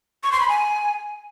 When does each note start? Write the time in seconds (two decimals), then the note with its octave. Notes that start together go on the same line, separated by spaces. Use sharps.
0.23 C#6
0.32 C6
0.40 B5
0.48 G#5